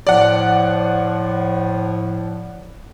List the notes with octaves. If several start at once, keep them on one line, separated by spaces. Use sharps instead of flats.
A2 F3 D5 F#5